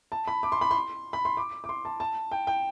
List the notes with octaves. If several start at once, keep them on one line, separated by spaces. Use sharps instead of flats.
A5
B5
D6
C6
B5
C6
B5
C6
D6
D6
C6
A5
A5
G5
G5